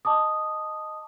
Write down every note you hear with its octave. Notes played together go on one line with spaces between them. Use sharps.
D#5 A5 D6 D#6